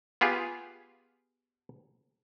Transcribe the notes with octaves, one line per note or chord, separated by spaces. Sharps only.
B3 F4 G4 G#4